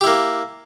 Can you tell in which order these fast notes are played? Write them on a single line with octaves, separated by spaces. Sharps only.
G4 E4 A#3